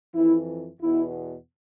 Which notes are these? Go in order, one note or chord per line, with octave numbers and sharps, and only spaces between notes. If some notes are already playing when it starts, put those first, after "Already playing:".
F2 E3 E4
E2 B2 E4